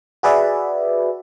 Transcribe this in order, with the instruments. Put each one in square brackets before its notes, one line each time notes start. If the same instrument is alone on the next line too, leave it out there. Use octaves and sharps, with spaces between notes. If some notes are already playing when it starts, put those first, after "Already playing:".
[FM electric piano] F#4 G#4 B4 D5 E5